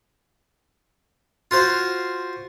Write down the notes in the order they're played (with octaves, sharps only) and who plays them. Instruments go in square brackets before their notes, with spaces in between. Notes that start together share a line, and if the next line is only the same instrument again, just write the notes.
[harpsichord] F4 F#4 C5 F5